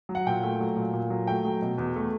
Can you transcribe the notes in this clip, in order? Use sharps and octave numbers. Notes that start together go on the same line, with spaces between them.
F#3
F#5
A#2 G5
A3
F#3
A#2
A#2
F#3
A3 G5
F#3
B2
E2
A3